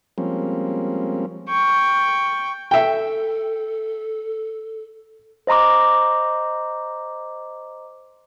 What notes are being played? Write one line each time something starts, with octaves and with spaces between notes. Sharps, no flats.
F3 G3 G#3 A#3 C4 C#4
G5 C#6
A4 E5 G5
C5 D#5 A#5 C6 D6